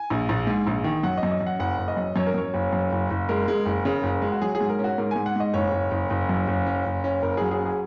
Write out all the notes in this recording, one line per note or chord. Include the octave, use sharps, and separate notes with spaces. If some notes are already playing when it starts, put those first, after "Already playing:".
Already playing: G#5
A#1
A#1
G#2
A#1
D#3
F#2 F#5
D#5
F#2
D#5
F#2
F#5
F#1 F#5
F#1
D#5
F#2
F#2 C#5
A#4
F#2 C#5
F#1
F#2
F#1
F#1
G#3 A#4
G#3
F#1
C#3
F#1
G#3
F#4
F#3 G#4
G#4
G#2
A#4
C#4
F#4
G#2 A#4
G#2 G#5
F#5
G#2 D#5
F#1 C#5
F#1
F#1
F#1
F#2
F#1
C#4
F#1
C#4
F#1 A#4
F#3 G#4
G#4
C#4
G#4